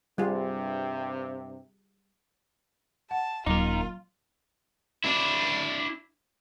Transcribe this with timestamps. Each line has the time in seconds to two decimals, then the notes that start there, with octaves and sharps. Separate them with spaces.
0.18 G2 C3 G3 F4 G#4
3.11 F#5 A5
3.46 D#1 F#3 D#4 F4 A#4
5.04 D4 E4